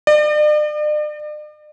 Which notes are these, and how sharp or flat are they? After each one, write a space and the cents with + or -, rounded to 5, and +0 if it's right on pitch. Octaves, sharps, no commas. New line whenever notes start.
D5 +40